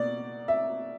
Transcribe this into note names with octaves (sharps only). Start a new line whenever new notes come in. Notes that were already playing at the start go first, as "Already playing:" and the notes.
Already playing: B2 A#3 D5
E5